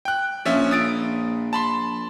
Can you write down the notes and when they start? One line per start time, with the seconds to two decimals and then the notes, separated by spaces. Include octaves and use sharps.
0.05 G5 F#6
0.45 A#1 F3 C#4 E5
0.71 D#6 A6 D7
1.53 A5 B5 C6